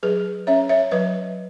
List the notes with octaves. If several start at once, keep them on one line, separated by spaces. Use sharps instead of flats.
F#3 G#4 B4
C#4 C#5 E5
C#5 E5
F#3 B4 D#5